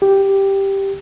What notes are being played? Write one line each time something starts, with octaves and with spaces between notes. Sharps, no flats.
G4